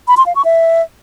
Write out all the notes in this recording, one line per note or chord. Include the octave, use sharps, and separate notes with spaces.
B5
C6
F5
C#6
E5